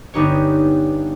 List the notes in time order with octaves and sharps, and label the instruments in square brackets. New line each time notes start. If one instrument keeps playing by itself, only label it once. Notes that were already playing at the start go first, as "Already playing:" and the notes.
[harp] G1 B3 D#4 G4 C#5